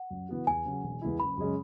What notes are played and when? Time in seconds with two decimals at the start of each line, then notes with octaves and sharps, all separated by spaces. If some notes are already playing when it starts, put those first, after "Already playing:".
Already playing: F#5
0.11 F#2
0.29 E3 B3 F#4
0.47 E2 G#5
0.65 C#3 F#3 C#4 F#4
0.83 E1
1.02 E2 E3 G#3 E4
1.20 F#1 B5
1.37 F#2 C#3 G#3 C#4